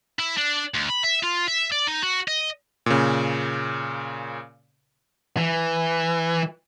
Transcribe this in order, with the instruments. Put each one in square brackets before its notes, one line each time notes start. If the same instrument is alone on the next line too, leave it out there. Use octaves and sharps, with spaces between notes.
[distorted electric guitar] E4
D4
D2
B5
E5
F4
E5
D5
D#4
F#4
D#5
[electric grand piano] A#2 C#3
[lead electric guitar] E3